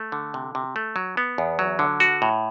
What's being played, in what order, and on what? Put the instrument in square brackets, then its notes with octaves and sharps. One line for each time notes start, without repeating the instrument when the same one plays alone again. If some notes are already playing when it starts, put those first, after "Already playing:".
Already playing: [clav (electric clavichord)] A3
D3
C3
C3
A3
F#3
B3
E2
F#3
D3
F#4
A2